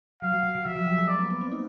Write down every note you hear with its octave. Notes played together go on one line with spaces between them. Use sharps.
F#3 F5
F#3
F#3
F#3
F3 E5
F#3
G3
G#3
A#3 D5
B3
B3
C4
D#4